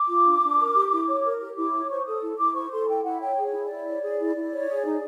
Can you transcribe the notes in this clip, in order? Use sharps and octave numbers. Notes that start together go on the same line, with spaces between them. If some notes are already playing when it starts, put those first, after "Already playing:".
Already playing: D6
F4
D4
D4
A#4
G4
E4
C#5
A#4
G4
E4 D6
C#5
C5 C#6
A4 D#6
E4
E4 D6
C5 C#6
A4 C6
E4 G5
E4 F#5
C#5 G5
G#4
C#5
E4
D5
E4
C#5
G#4
E4
E4
C#5
G#4
D#4